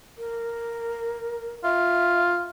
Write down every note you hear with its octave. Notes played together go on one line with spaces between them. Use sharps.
A#4
F4 E5